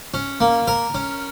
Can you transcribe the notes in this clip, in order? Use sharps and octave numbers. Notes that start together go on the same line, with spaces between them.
C#4
A#3
A#4
C#4